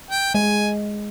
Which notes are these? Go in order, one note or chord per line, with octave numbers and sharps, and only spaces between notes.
G5
G#3 G#5